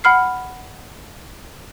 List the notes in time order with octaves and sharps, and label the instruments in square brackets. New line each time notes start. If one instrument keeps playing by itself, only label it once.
[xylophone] F#5 B5 F6 C7